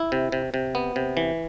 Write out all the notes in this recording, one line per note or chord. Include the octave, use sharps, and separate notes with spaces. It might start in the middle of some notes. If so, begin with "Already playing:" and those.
Already playing: E4
C3
C3
C3
B3
C3
E3